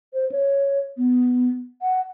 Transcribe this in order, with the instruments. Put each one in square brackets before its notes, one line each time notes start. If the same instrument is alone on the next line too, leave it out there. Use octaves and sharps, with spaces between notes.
[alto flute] C5
C#5
B3
F#5